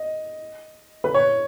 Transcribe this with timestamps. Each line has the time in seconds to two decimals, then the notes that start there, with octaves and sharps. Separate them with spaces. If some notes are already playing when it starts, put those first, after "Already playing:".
Already playing: D#5
1.04 B4
1.14 C#5